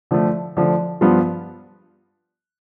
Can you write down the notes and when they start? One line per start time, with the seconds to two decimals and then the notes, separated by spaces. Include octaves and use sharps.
0.11 D3 F3 A3
0.57 D3 F3 A3
1.01 G2 F3 B3 D4 F4